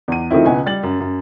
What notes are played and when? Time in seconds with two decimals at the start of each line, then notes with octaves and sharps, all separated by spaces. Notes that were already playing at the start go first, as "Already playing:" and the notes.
0.08 E2 D#7
0.31 D#3 F3 A3 C4 E4
0.45 C#2 B2 B3 G#5
0.66 G3 A6 F#7
0.83 F#2
1.00 F#2